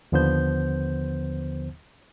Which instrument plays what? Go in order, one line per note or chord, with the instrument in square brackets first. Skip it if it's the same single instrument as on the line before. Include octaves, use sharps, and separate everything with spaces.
[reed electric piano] D#2 D3 F3 B3 C5 G6